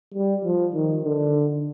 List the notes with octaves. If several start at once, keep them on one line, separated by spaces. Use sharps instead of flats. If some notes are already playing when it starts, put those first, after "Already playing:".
G3
F3
D#3
D3